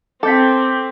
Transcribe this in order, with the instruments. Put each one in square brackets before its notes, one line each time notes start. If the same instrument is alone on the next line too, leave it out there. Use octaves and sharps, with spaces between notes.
[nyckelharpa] C4 [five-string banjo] A4 [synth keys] D6 G6 B6